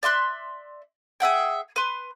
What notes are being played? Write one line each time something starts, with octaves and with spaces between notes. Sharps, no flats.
D5 E5 C6 F#6
G#4 E5 F#5 G5
B4 C6